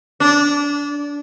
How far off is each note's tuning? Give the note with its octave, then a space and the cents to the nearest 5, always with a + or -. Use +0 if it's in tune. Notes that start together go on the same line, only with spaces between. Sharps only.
D4 -25